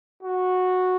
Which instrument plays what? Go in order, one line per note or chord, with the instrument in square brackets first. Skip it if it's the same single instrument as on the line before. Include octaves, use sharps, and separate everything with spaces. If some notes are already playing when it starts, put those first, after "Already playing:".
[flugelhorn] F#4